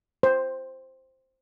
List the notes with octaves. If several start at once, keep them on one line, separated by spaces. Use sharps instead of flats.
C5